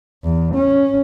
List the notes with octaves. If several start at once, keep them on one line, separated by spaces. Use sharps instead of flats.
E2
C#4